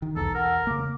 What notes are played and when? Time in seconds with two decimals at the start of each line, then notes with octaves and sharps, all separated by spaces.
0.02 D#3
0.16 B1 E2 A4 A#5
0.34 A#4 F#5
0.67 C#3 A#3 D6